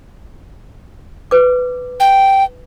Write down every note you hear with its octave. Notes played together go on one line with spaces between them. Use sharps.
B4 D6
G5